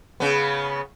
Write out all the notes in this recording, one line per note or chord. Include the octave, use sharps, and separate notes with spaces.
C#3 B3